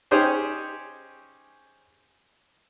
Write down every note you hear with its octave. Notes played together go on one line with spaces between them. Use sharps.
C#4 D#4 G4 G#4 C5 C#5